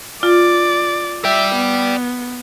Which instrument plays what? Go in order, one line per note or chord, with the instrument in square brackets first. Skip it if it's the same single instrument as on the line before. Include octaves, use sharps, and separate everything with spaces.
[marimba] F4 [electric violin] D5
[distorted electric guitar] D5 G5 [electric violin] E5
[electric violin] B3